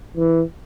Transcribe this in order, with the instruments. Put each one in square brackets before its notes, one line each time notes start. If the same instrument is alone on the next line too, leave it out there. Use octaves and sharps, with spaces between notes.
[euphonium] E3